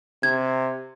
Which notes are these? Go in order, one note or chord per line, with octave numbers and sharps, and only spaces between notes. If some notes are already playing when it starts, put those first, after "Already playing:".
C3 G#6